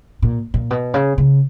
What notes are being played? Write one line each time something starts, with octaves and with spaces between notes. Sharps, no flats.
A#2
A#2
B2
C#3
C#3